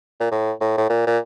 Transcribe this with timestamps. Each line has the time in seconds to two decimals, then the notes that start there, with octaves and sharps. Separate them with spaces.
0.20 A#2
0.31 A2
0.61 A2
0.77 A2
0.90 A#2
1.07 A#2